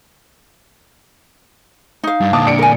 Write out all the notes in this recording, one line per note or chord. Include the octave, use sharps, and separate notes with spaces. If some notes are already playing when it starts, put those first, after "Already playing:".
D#4 F5
G2
A#2 D3 A5 D6 D#6
D4 C#7 D7
A#4 G#5